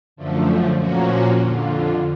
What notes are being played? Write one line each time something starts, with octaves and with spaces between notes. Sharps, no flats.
F#2 D3 F3 A3
A#2 F3 A#3 C#4 F#4
F2 D3 F3